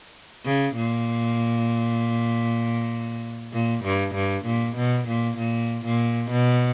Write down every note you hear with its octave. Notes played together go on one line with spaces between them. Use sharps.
C#3
A#2
A#2
G2
G2
A#2
B2
A#2
A#2
A#2
B2